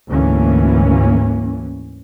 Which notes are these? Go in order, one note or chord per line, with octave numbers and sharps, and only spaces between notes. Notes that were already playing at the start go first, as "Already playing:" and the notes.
D2 G#2 E3 A#3 C#4